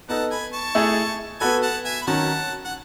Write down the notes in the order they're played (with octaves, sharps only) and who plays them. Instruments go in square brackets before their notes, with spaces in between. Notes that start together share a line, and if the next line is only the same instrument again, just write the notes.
[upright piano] B3 D#4 A4 [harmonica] F#5 A5
[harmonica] G#5 B5
A5 C#6
[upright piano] A3 E4 G#4
[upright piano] B3 F#4 A4 [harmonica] G#5 B5
[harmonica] F#5 A5
E5 G#5
B5
[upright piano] D#3 F#3 C#4 [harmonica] F#5 A5
[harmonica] F#5